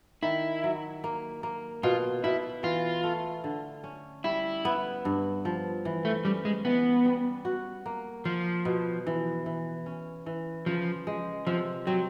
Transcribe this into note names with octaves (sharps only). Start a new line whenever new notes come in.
D#3 E4
F#3
A#3
A#3
B2 F4
B2 E4
E3 F4
A3
D3
C#4
G3 E4
B3
G2
F3
E3
A3
G3 C#4
G#3
E3 B3
G3
F#4
A#3
F3 F4
B2
E3
E3
C#4
E3
C#3 F3
G#3
C3 F3
F#3 C4